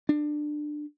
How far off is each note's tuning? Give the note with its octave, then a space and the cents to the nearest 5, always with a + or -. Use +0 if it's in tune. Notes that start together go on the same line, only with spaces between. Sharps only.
D4 +20